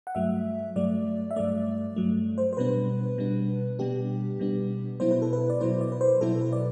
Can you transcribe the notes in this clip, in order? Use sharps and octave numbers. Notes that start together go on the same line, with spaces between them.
F#5
G2 F#3 A3 E5
G2 F#3 A3 D5
E5
G2 F#3 A3 D5
G2 F#3 A3
C5
C5
B2 G3 B3 D4 B4
B2 G3 B3 D4
B2 G3 B3 D4 G4
B2 G3 B3 D4
B2 F#3 B3 E4 C5
B4
A4
B4
D5
B2 F#3 B3 E4 C5
D5
B4
C5
B2 F#3 B3 E4 A4
B4
D5